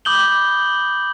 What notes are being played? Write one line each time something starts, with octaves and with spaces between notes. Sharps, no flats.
B5 D6 D#6 G6 F#7 G7